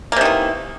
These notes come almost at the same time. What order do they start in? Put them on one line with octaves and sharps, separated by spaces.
A#3 C3 D#3 E3